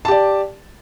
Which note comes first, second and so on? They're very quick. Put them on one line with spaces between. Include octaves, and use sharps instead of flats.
A5 G4 D5